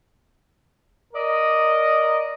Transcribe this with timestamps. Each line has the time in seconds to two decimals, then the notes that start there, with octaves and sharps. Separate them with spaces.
1.14 A#4 D5 D#5